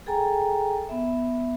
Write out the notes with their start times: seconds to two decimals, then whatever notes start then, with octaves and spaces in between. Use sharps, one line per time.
0.07 G#4 A4 G5 G#5 A#5
0.89 B3 E5